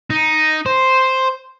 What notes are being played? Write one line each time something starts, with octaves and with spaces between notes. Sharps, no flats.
D#4
C5